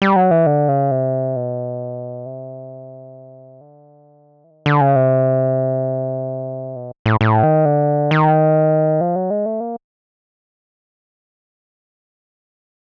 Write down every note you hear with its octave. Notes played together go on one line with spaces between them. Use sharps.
G3
F#3
E3
D3
C#3
C3
B2
C3
D3
E3
D#3
D3
C#3
C3
B2
A2
A2
D#3
D3
D#3
F3
F#3
G#3
A3
A#3